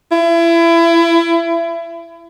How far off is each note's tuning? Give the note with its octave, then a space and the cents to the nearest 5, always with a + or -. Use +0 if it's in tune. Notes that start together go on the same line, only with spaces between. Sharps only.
E4 +30